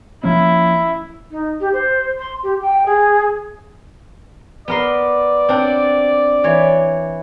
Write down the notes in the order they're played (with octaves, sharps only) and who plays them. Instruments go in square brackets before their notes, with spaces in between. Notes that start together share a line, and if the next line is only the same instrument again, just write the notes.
[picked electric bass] F3 A#3 C#4 [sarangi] E4
[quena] D#4
G4
C5
C6
G4
G5
G#4
[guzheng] B3 A#4 C6 [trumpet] D5
[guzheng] C4 D4 F#5
E3 C#5